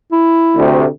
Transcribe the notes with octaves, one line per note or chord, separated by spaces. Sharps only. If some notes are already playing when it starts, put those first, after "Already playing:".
E4
D2 C3